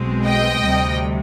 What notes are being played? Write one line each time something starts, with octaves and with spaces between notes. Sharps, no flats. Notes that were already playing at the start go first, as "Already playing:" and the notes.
Already playing: B1 B2 G#3 C4
D#5 G5
D2 C3 G3